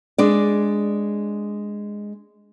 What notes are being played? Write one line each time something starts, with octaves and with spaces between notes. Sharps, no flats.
G#3 D4 D5